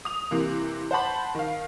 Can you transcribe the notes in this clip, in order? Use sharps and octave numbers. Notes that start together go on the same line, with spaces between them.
D#6 F7
C3 E3 A#3
C5 F#5 A5 B5
D#3 F5